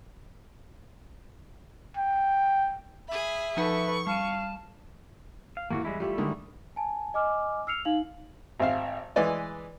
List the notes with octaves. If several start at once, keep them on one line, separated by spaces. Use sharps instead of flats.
G5
G#4 E5 B5
F3 D#4 A4 B4 F#5 C#6
G3 F5 A5 D#7
F5
E2 E3 A#3 F#4
G3 G#3 E4
G3 A3 E4 F4 G4
D3 D#3 G#3
G#5 A5
D#5 G#5 D6 F6
E6 F6 C7 C#7 F7
D#4 F5 F#7
G#1 C4 E5 F5
E3 G#3 B4 D5 D#5